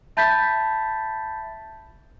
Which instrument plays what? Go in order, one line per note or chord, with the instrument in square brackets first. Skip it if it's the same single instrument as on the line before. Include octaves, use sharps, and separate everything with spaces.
[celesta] E5 A5 B5 G6 A6 B6